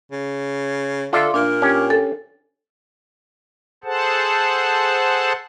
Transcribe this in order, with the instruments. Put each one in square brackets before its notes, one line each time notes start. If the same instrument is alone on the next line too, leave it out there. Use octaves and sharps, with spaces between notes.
[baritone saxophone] C#3
[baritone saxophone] D3 [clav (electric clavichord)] F4 D5 E5 [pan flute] A4
[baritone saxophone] A#2 [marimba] D4 [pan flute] A#4
[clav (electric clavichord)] C#4 G4
[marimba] A4
[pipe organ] G#4 A4 C5 F#5 A5